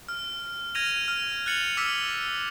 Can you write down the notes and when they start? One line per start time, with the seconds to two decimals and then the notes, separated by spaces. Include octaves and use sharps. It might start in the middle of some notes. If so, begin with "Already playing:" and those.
0.09 F6
0.75 F6 G#6 A#6 D#7 F7
1.08 F6
1.46 F#6 A6 C#7 F7 F#7
1.77 D6 E6 F6 B6 F#7